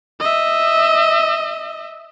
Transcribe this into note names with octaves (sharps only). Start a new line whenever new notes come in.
D#5 E5